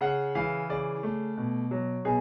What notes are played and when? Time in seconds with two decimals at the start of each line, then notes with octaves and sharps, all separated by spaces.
0.01 C#3 F#5
0.35 E3 F5
0.69 C#3 D5
1.03 A3
1.37 B2
1.71 F#3
2.05 B2 G#4